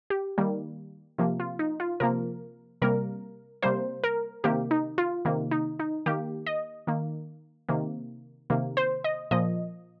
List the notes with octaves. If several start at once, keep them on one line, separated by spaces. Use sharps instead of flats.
G4
D#3 G3 A#3
C3 F3 A#3
F4
D#4
F4
C3 F3 A#3 A#4
C3 G3 A#3 A#4
C3 G3 A#3 C5
A#4
C3 D#3 A#3 G4
D#4
F4
C3 D#3 A#3
D#4
D#4
D#3 A#3 G4
D#5
D#3 A#3
C3 D#3 A#3
C3 D#3 A#3
C5
D#5
A#2 F3 A#3 D#5